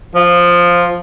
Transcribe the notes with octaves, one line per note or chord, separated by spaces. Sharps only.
F3